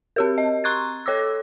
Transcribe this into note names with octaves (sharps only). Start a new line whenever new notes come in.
C4 G4 A#4
D#5
A#5 C6 C#6 F#6 G#6 A6
A4 C#5 D6 E6